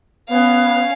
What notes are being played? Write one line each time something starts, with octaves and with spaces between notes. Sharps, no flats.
B3 C#4 F5